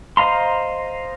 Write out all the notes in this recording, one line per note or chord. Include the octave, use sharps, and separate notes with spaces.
C5 D#5 F5 A#5 C6